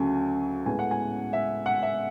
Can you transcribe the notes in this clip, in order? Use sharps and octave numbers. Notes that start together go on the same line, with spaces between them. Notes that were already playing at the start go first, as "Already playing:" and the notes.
Already playing: D2 C#3 F#3 G#5
A2 G#3 B3 G#5
F#5
G#5
E5
F#5
E5